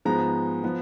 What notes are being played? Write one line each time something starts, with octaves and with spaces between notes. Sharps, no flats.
G#2 F3 G#3 B3 A#5
F3 B3